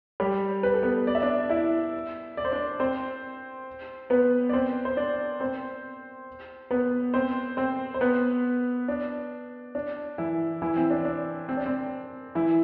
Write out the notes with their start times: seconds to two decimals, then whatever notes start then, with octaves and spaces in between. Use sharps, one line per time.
0.20 G3 G4
0.63 B4
0.74 A4
0.83 B3 B4
1.07 D5
1.15 E5
1.22 D4 D5
1.49 E4 E5
2.37 D5
2.45 C5
2.52 D4 D5
2.80 C4 C5
4.10 B3 B4
4.49 D5
4.53 C4 C5
4.85 C5
4.97 D4 D5
5.40 C4 C5
6.71 B3 B4
7.14 C4 C5
7.57 C4 C5
7.94 C5
8.01 B3 B4
8.88 D4
9.75 D4
10.18 E3 E4
10.62 E3 E4
10.76 C4
10.90 D4
11.05 D4
11.49 C4
11.57 D4
11.66 C4
12.35 E3 E4